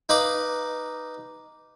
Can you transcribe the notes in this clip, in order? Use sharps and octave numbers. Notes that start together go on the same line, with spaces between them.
D#4 B4 F5 D6